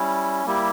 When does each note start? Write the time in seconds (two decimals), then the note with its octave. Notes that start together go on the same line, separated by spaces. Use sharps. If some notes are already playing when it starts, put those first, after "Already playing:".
Already playing: G3 C#4 E4
0.46 G3 A#3 E4 G4